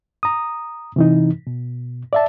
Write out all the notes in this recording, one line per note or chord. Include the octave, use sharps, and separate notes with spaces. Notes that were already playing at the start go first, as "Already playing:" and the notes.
A#5 D#6
C3 E3 D#4
B2
D5 E5 A5